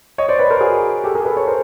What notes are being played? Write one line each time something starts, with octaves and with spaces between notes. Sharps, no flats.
C#5 D#5
C5 D5
B4 C#5
A#4 C5
F#4 G#4
G4 A4
G#4 A#4
A4 B4
B4 C#5
A#4 C5